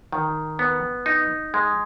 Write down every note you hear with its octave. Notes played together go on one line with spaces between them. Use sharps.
D#3
B3
D#4
G#3